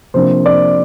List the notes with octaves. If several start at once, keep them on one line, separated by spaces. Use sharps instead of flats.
C3 F3 A#3 D4 C5
D5